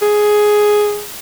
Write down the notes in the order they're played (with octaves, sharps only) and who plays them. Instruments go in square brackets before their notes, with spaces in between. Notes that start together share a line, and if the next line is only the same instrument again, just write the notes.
[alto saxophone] G#4